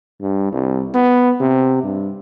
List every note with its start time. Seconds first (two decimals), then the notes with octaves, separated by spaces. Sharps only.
0.21 G2
0.52 C2
0.95 B3
1.40 C3
1.84 G2